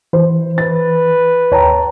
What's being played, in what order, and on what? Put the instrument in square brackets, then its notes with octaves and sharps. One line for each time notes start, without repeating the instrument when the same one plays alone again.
[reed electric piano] E3 [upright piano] C5
[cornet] B4 [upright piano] A6
[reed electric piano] D#2 G5 [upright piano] C#5 A5 A#5